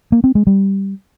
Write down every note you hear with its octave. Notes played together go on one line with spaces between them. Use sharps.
A#3
C4
G#3
G3